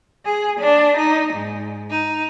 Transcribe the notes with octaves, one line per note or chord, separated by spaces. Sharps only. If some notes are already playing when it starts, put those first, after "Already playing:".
G#4
D4
D#4
G#2
D#4